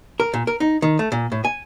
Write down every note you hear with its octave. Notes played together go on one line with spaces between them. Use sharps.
A#4
A#2
A#4
D#4
D#3
A3
A#2
A2
G#5